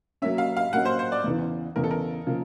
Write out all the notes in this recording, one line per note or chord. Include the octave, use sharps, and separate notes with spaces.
F#3 A#3 C#4 E5
F5
F5
F#3 A#3 C#4 F#5
C5
C5
D5
E2 C#3 E3
E2 C#3 E3 A#4
A4
A#4
C#3 F3 A#3